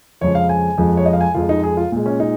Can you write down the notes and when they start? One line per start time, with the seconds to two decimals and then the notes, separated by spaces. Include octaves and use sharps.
0.21 F2 C#3 F3 G#3 C#5
0.35 F5
0.49 G#5
0.78 F2 F3 G#3
0.97 C#5
1.05 D#5
1.13 F5
1.21 G#5
1.34 F2 F3 G#3 F4
1.49 D#4
1.64 G#4
1.77 F4
1.92 A#2 G#3
2.06 C#4
2.20 D#4